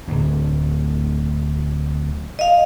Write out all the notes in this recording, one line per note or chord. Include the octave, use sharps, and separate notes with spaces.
D1 D2
D#5 F5